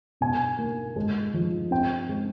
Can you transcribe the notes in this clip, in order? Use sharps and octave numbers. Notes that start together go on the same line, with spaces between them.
B2 G#5
A#3
G#3
F3
C4 G5
G#3